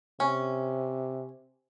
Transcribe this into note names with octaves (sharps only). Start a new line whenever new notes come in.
C3 C#4